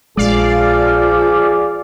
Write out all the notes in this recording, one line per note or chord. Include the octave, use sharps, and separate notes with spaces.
A#1 F3 G#3 G#4 D5 F5